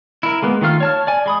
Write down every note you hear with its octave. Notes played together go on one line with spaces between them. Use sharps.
E4 A#4
G#3 A#3 B3
D#3 A3 F4 F6
C#5 A5 F6
D5 G#5
G#3 B5 D#6